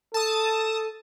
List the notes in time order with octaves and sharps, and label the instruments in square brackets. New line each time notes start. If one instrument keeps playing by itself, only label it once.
[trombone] A4 [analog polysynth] A5 D#6